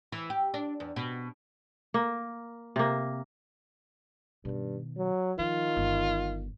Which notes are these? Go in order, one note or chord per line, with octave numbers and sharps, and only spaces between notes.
E3
G4
D4
E2
B2
A#3
C3 A#3
G2 B2 D#3
F#3
D#3 F3 F4
G1